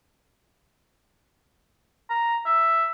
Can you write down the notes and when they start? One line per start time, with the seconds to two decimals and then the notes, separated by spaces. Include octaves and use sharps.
2.10 A#5
2.46 E5